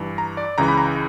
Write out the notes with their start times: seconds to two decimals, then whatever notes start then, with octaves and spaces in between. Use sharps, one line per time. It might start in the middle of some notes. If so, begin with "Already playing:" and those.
Already playing: G2 E3
0.18 A#5
0.37 D5
0.58 C#2 C#3 E3 A#5
0.68 B5
0.77 A#5